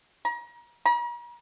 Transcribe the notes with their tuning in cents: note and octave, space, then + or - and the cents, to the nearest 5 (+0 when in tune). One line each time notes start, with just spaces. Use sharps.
A#5 +35
A#5 +45